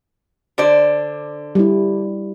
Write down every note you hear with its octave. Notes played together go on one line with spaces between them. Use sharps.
D3 C5 D5
G3 E4